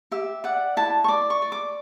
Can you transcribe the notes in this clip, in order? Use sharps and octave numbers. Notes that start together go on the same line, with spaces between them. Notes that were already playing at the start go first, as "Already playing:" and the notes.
G4 E5
D5 F#5
E4 A5
C#6
D5 D6
C#6
D5
D6